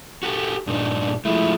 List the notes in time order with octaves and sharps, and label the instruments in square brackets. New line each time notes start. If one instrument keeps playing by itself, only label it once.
[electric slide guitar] F#4 G4 A4
[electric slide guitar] G2 A#2 D#4 [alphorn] D4
[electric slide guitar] F3 G#3 A3 [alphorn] E4